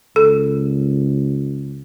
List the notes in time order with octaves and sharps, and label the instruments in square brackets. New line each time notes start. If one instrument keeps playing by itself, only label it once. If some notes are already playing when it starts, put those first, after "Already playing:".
[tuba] C#2 [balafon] A4